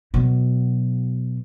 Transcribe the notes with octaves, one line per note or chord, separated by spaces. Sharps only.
B2 F#3